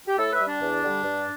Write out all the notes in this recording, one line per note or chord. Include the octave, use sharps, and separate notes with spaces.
G4
A2 E4 A4
B4 E5
G3
D4
E2
D3 G3
G2